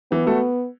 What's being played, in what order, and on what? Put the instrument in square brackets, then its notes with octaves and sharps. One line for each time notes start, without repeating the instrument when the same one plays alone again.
[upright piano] E3 [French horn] B3
[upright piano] A3 F#4 A4